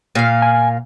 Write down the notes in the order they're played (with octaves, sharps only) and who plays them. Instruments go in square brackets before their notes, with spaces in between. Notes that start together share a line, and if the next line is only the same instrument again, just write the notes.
[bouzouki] A#2 F5
[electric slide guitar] G#5